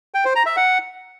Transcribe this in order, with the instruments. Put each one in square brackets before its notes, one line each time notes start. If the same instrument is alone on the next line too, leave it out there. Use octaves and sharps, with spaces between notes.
[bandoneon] G5
C5
A#5
E5
F#5